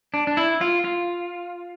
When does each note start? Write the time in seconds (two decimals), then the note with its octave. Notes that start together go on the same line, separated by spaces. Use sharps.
0.14 D4
0.27 D4
0.37 E4
0.61 F4
0.84 F4